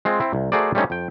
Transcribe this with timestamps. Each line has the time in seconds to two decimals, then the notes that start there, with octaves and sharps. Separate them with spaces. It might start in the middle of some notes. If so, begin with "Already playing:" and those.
0.05 G#3 C4 F4
0.20 C4 E4
0.33 C2
0.52 A3 F#4 G#4 A#4 C5 D5
0.75 G3 A3 C4 C#4 D#4
0.90 F2 G5